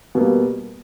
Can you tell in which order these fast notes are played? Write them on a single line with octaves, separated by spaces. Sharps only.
B2 A#3 G3